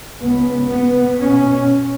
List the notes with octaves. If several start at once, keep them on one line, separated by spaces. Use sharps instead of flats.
C#2 C#3 B3
B3
B2 C#4